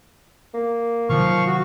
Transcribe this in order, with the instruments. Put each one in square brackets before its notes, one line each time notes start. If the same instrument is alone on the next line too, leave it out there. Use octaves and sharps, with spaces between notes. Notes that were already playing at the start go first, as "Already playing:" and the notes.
[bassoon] A#3
[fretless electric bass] C3 D#3 F#3 [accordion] F3 F5 C#6
[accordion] F#4